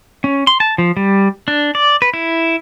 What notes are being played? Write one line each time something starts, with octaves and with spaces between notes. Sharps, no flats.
C#4
C6
A5
F3
G3
D4
D5
B4
E4